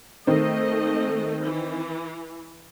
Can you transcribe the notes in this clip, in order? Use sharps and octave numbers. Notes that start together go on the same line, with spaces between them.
D#3 A3 C4 D#5
E3